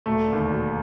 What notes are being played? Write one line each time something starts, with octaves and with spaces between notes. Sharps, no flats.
E1 A3
D#2 D3
E1